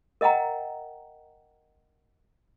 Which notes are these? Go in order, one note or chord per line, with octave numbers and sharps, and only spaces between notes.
A#4 D#5 F#5 G5 A#5